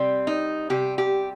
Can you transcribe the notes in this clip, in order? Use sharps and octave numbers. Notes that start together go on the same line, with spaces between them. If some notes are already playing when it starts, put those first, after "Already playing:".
Already playing: C3 G3 C4
D#4
C3 G3 G4
G4